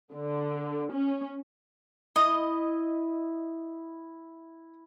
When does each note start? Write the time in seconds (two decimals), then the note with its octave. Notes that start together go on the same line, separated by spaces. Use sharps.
0.13 D3
0.92 C#4
2.16 E4 D#5 D#6